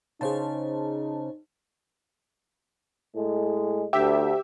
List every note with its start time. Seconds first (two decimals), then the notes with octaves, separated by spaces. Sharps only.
0.21 C#3 D#4 G#4 C5 A5
3.16 A2 G#3
3.93 D2 G4 E5